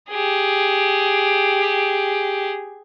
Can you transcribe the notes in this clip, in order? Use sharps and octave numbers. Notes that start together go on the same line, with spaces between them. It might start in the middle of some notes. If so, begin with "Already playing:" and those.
G4 G#4